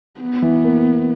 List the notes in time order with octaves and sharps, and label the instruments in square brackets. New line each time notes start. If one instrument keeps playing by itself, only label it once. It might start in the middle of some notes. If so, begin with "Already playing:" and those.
[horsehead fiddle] B3
[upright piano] E3
A#3